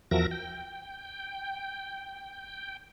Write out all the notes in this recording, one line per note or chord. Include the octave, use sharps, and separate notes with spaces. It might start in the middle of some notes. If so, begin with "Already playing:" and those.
E2 F3 F#4 A#4 E5 A#6
G5